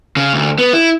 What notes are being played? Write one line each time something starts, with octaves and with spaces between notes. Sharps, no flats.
C#3
D2
B3
E4